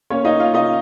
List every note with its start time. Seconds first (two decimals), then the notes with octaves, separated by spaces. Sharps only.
0.10 A#3 C#4 C#5
0.25 D#4 D#5
0.40 C#4 F4 F5
0.54 D#4 D#5